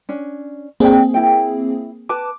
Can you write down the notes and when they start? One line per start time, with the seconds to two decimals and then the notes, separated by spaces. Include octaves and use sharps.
0.09 C#4 D4
0.80 A#3 C4 D4 G#4 G5
1.14 E4 G5
2.09 B4 A5 D6